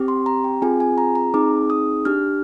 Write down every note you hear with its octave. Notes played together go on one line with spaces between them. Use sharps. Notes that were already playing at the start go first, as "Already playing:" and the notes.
Already playing: C4 G4
C6
A#5
G5
C4 F4 G#4 G#5
G#5
A#5
A#5
C4 D#4 G#4 D6
D#6
D4 G4 F6